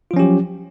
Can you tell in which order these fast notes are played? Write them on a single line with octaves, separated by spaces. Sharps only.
F4 F3 C#4 G4 F#3